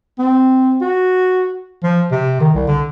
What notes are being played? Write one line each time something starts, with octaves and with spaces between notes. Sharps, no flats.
C4
F#4
F3
C3
D#3
C2
D3